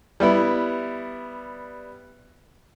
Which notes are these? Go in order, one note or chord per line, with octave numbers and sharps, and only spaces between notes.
G3 B3 E4